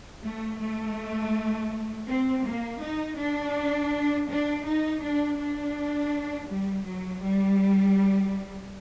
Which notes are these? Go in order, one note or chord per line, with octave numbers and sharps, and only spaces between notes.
A3
A3
C4
A#3
D#4
D4
D4
D#4
D4
D4
G3
F#3
G3